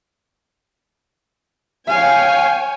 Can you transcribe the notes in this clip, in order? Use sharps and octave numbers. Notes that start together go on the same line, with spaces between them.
C#5 F5 G5 G#5